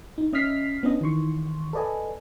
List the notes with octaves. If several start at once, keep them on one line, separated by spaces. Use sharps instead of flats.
D#4
C#4 D#5 E5 F6 B6 C7
B3 C#4 D4 D#5
D#3 E3 C6 C#6
A4 B4 D5 D#5 G#5